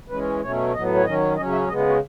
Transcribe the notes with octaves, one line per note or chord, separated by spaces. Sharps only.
E3 G#3 C#4 B4
B2 F#3 A3 C#4 C#5
A2 F#3 B3 D#5
C#5
D#3 F#3 C#4 D#5
C#3 F#3 C#4 D#5
E5
C#3 G#3 B3 D#5
E4
F#4